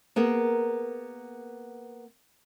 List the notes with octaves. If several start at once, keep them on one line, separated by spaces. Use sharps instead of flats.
A#3 B3 G#4 A#4